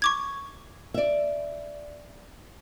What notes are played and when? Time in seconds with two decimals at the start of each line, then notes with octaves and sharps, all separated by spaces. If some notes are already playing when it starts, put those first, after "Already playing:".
0.02 C#6 D6 G#6
0.94 D5 E5